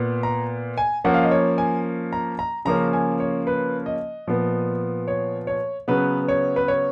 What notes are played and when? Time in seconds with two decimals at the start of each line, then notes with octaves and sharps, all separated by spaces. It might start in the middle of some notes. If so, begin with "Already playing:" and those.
Already playing: A#2 B3
0.23 A#5
0.78 G#5
1.04 F3 A#3 C#4 F#5
1.14 F5
1.23 D#5
1.31 C#5
1.58 G#5
2.13 A#5
2.39 A#5
2.65 C#3 F3 A#3 C#4 A#5
2.93 G#5
3.20 C#5
3.47 B4
3.86 D#5
4.27 A#2 F3 B3
5.08 C#5
5.47 C#5
5.88 C#3 F#3 B3 B4
6.28 C#5
6.56 B4
6.68 C#5